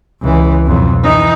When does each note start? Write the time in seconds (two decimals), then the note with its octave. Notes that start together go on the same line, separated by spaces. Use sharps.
0.21 C#2 E3
0.66 B1 F2
1.03 E3 D#4